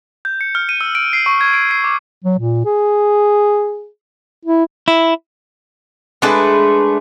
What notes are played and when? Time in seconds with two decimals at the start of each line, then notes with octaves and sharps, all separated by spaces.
0.25 G6
0.41 C#7
0.55 F6
0.69 D#7
0.81 E6
0.95 D7
1.13 C7
1.26 C#6
1.41 G#6
1.54 D7
1.71 C7
1.84 D6
2.24 F#3
2.39 A#2
2.65 G#4
4.45 E4
4.88 E4
6.22 G#3 A3 D4 B4